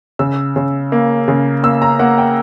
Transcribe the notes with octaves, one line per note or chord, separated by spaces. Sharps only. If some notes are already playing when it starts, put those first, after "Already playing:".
C#3 E6
C#3
A#3
C#3
A#3 E6
A#5
A#3 F#5
G5